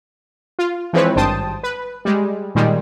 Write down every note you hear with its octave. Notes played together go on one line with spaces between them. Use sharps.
F4
E3 F3 G#3 C4 B4 C#5
G#1 G2 C5 G5 A5 D#6
B4
G3 G#3
A#2 D#3 G3 G#3